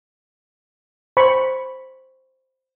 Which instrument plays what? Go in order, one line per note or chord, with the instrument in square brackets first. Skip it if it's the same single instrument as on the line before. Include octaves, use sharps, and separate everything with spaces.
[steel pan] C5 B5 C#6